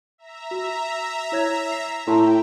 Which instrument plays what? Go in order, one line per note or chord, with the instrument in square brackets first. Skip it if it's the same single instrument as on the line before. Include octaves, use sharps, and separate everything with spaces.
[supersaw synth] E5 A#5
[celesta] F#4
E4 C#5 G#6
C7
[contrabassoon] A2 [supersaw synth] G5 [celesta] A5 A#5 C6